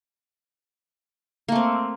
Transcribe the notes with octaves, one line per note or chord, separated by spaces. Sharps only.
A3 A#3 C4